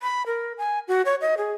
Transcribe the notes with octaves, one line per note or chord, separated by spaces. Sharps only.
B5
A#4
G#5
F#4
C#5
D#5
G#4